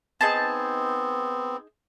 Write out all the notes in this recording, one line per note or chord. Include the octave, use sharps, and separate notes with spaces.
B3 C4 D#4 G#4 A5